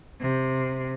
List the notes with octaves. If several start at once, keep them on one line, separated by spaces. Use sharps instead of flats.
C3